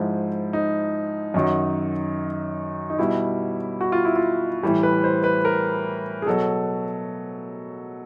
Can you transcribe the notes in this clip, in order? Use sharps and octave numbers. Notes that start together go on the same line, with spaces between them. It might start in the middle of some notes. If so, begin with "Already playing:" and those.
Already playing: G#2 F3 E4
D#4
F#2 D#3 F#3
D#4
B2 G3 E4
F#4
F4
E4
F4
A2 E3 G3
B4
C5
B4
A#4
G#4
B2 F#3 A4